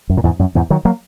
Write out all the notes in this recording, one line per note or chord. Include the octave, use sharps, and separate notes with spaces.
F#2
A#2
E2 G#2
F#2
E2 G#2
D#3 F#3
F#3 A#3